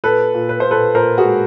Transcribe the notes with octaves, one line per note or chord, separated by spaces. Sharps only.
A#2 A4 B4
A#2
B4
A#2 C5
A4 B4
A#2 A#4 C5
F#4 G#4
G#3